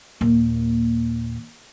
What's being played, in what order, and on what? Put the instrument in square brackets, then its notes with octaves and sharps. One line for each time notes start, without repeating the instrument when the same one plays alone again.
[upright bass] D#2 A#2